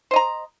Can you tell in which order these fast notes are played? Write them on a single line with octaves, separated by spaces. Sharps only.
C5 D#5 A#5